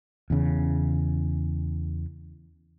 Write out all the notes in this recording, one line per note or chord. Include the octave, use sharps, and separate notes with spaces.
E2 C#3